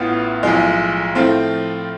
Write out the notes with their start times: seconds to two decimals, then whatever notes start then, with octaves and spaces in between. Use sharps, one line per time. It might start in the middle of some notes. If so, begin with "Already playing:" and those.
Already playing: A1 A2 E3 B3 F4
0.43 B1 A2 F3 G#3
1.15 A2 F3 A3 C4 F4